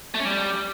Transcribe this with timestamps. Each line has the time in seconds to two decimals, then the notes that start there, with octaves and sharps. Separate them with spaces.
0.14 A3
0.20 C#4
0.25 G3